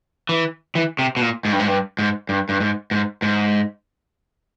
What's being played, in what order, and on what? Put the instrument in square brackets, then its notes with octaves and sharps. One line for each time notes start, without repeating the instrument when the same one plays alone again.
[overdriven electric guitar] E3
E3
C3
B2
A#2
G#2
G2
G#2
G2
G#2
G2
G2
G#2
G#2
G#2